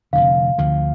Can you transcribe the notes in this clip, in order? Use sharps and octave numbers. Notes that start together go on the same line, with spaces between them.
F1 F2 D3 F5
D2 D3 F3